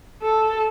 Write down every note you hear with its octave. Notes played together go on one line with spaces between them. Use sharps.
A4